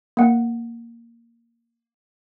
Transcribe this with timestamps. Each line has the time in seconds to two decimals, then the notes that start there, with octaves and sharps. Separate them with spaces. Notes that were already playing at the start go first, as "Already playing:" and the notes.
0.17 A#3 F#5